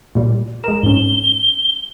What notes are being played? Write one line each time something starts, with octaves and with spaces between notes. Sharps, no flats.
A#2 G3
G#3 A#4 E7
G#2 C#4 G7